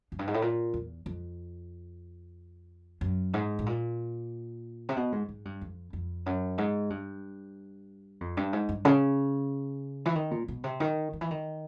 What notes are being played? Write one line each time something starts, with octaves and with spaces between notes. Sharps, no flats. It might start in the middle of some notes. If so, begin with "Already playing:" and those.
F#2
G2
G#2
A2
A#2
E2
F2
F#2
G#2
A2
A#2
C3
B2
G#2
G#2
G2
F2
F2
F#2
G#2
G2
F2
G2
G#2
G2
C#3
E3
D#3
A#2
B2
C3
D#3
D#3
E3
D#3